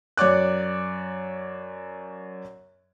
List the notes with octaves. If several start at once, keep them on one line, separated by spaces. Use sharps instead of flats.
F#2 C#5 D5 D6 F#6